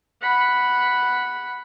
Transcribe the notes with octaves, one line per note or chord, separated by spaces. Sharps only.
F#5 B5